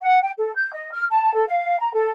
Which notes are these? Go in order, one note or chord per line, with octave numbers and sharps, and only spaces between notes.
F#5
G5
A4
G6
D#5
F6
A5
A4
F5
A#5
A4